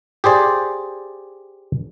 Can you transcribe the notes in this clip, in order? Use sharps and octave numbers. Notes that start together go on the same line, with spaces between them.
G4 G#4 C5 D5